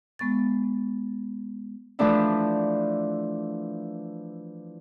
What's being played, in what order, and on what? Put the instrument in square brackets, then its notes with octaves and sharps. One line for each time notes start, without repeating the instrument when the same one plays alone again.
[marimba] G#3 B3 C#6 A6
[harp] E3 F3 A3 D4 E4